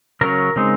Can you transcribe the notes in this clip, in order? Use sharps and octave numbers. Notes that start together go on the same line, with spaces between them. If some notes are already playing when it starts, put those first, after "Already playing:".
C#3 F#3 C#4 A#4
C#3 G#3 C4 D#4